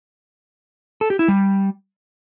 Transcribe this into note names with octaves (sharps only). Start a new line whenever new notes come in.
A4
G4
E4
G3